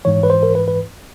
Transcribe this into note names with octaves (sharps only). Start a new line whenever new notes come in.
G#2 E3 C#5
B4
C5
A#4
B4
B4